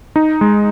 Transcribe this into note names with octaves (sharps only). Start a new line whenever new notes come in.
D#4
G#3